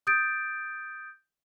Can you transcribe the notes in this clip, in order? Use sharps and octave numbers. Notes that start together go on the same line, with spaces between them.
D#6 G6 A6 D7